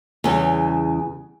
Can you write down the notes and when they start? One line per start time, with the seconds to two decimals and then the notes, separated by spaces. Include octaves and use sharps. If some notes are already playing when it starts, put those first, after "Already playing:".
0.24 E2 C#3 G3